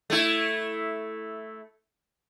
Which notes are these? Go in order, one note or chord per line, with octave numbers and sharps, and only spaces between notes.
A3 E4